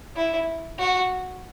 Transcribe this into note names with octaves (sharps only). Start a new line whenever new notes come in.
E4
F#4